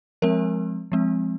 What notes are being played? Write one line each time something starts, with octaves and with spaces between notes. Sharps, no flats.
F3 G#3 C4 A#4
F3 G#3 C4